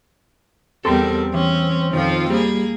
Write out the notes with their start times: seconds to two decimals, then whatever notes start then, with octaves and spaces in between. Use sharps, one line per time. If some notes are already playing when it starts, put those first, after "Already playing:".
0.85 E2 G3 C4 A4 A#4
1.34 E3 C#4
1.93 F2 D#3 F3 F4
2.30 G3 A#3 G#4